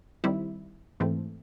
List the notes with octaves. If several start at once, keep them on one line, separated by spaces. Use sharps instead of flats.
D#3 G3 C4 E4
G#2 E3 A3 C4